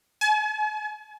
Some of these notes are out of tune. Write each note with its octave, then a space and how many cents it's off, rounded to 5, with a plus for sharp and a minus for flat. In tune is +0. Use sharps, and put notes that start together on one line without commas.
G#5 +45